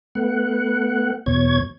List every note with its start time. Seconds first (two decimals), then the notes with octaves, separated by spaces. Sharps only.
0.15 A3 B3 F#5
1.26 E2 B2 C#5 G#6